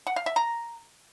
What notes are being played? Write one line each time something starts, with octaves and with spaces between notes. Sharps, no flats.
F#5
F5
E5
A#5